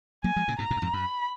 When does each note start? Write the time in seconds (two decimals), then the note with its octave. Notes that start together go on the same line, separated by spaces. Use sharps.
0.24 F#3 A#3 G#5
0.36 F3 G#3
0.48 A#2 C#3
0.58 G#2 B2 A#5
0.71 G#2 B2
0.77 F#2
0.82 F2 G#2
0.94 F#2 B5